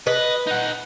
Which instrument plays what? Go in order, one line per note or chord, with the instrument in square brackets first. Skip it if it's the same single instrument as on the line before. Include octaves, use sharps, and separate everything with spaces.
[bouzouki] B4 [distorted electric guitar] D#5
[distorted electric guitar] D#4 F#5